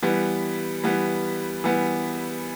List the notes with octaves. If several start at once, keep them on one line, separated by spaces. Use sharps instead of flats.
E3 G3 B3
E3 G3 B3
E3 G3 B3